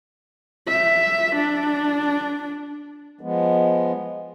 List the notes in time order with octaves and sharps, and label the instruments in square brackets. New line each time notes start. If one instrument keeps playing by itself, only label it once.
[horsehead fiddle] E5
D4
[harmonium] F3 G#3 B3